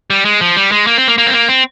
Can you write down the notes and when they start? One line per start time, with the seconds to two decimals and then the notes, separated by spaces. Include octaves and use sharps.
0.10 G3
0.25 G#3
0.41 F3
0.56 G3
0.72 G#3
0.87 A#3
0.98 C4
1.08 A#3
1.18 A#3
1.27 C4
1.33 A#3
1.49 C4